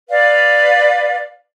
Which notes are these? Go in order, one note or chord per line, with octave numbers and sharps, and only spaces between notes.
B4 D5 F5